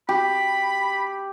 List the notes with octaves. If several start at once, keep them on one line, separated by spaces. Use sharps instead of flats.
G4 B5